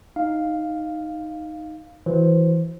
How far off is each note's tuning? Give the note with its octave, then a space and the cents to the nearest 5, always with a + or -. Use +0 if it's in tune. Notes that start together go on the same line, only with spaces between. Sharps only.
D#4 +0 F5 +0
E3 +0 F#4 -15 C5 +5